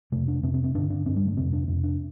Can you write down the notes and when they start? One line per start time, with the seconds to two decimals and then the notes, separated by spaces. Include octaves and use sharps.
0.12 F2 C3 A3
0.28 D4
0.43 F2 C3 C4
0.54 C4
0.64 C4
0.75 G2 D3 D4
0.90 D4
1.06 G2 D3 C4
1.16 G3
1.26 A3
1.37 F2 C3 C4
1.53 D4
1.68 F2 C3 C4
1.84 D4